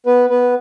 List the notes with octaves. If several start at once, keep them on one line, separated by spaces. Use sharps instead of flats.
B3 B4
B3 B4